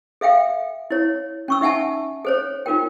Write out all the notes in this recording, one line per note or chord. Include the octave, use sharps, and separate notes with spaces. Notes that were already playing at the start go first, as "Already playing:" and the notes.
A4 E5 F5 G5
E4 C#5
C#4 C#6 E6
D#4 E5 F#5 G#5 A5
A4 C5 C#5
D#4 F4 A#4 G5